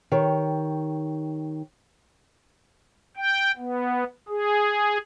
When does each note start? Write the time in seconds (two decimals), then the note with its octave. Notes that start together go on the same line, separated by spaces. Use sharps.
0.12 D#3 G4 C#5
3.17 G5
3.57 B3
4.29 G#4